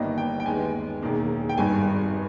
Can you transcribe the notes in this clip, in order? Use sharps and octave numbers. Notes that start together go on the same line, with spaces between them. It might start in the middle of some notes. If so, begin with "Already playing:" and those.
Already playing: G1 G2 D#3 G3 A#3 D#5
G5
G5
D#2 D#3 G#3 B3 G#5
E1 E2 D#3 A#3
G5
G#1 G2 D#3 G#5